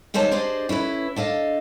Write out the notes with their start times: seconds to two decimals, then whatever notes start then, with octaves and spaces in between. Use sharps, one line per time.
0.14 D#2 G3 G#3 C5 C#5 A5
0.31 D4 G4 G#4 C5 D5 D#5
0.69 C#4 E4 A4 B4
1.16 D4 A4 D#5 F5